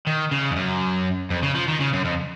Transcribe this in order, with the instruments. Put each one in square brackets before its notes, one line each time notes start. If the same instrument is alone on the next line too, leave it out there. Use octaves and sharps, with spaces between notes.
[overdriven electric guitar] D#3
C#3
F2
F#2
F2
C#3
F3
D#3
C#3
F#2
F2